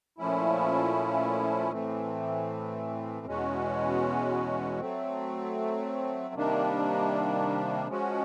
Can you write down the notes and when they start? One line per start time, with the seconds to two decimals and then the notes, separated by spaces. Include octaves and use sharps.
0.18 A#2 F3 A3 C#4 E4
1.72 A2 E3 A3 C4
3.26 E2 B2 G#3 C#4 F#4
4.79 F#3 A3 C4
6.34 C3 D#3 G3 A#3 D4
7.88 F3 G#3 C#4 F#4